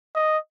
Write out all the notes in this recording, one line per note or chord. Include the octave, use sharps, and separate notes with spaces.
D#5